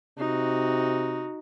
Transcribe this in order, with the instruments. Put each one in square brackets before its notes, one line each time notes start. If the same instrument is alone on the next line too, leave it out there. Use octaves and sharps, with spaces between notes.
[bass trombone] C3 [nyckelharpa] D#4 F#4